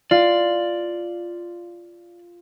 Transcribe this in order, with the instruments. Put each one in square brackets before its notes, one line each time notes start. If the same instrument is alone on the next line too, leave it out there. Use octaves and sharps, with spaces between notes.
[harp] F4 [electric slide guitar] D5